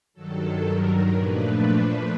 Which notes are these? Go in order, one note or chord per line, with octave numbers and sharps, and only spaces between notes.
G2 D#3 F#3 A4
A#4
A#2 F3 A3 D4 B4